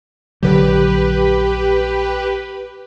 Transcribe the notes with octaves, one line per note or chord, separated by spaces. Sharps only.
A#1 D3 F#3 G4 B4